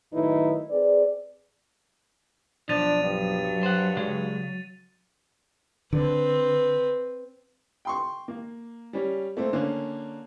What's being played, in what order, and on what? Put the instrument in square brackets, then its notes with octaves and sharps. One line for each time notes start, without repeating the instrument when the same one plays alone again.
[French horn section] F#2 A2 D#3 D#4 E4 B4
C4 G#4 B4 D5
[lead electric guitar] B1 F3 [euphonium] D4 [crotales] A6 D#7 F7
[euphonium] G2 [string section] F#3
[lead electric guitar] C5 F#5
C#3 G#3
[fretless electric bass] D3 [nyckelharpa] C4 B4
[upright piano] G5 C6 C#6
A#3
G3 C#4
A3 A#3 C4
D3 A#3 C#4